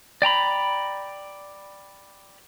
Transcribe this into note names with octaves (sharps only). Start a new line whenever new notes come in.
D5 G5 A#5 B5